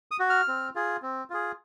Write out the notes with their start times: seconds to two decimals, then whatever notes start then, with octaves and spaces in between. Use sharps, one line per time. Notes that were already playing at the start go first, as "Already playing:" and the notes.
0.11 D#6
0.19 F#4
0.30 F6
0.48 C4
0.75 F4 G#4
1.02 C4
1.30 F4 G#4